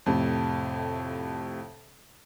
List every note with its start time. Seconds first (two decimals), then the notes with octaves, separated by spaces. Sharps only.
0.06 F2 A2 C3